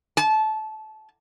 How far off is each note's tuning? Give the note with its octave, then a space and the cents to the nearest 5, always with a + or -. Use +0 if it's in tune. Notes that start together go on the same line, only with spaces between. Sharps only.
A5 -20